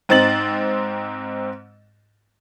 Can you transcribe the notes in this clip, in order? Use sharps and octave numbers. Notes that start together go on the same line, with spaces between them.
G#2 C4 D#4 C5 A6 F#7